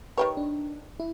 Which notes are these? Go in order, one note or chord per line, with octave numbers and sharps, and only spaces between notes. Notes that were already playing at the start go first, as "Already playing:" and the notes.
D#3 G4 B4 C#5
D4
E4